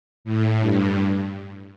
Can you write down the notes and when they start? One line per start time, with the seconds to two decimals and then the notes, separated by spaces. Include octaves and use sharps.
0.25 A2
0.60 G2